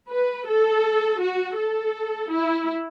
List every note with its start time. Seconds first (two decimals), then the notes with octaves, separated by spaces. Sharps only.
0.10 B4
0.47 A4
1.20 F#4
1.58 A4
2.31 E4